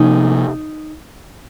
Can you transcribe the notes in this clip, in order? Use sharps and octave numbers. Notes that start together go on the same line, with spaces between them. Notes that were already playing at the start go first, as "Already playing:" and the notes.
Already playing: C3 F3 A#3 D#4